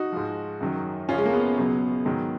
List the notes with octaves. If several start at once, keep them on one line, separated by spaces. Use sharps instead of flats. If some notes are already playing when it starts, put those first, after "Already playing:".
Already playing: D#4 F#4
G#2 F3
F#2 D#3 F#3
F#2 C#3 F3 C#4 F4
G#3
A#3
G#3 B3
C#2 B2 F#3
G#2 D#3 F#3